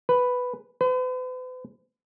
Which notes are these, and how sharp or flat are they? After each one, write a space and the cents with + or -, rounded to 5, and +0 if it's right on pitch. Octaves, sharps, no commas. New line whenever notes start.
B4 +5
B4 +45